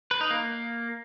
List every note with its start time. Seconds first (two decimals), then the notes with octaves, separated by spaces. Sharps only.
0.11 B4
0.21 D#4
0.31 A#3